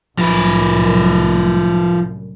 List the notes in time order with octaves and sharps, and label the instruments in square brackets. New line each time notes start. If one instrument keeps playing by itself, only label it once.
[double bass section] C2 F#2 A2 [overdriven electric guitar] F3 B4